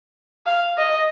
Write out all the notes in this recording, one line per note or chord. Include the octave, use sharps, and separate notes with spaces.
F5
D#5